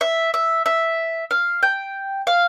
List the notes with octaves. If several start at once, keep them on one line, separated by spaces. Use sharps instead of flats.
E5
E5
E5
F5
G5
F5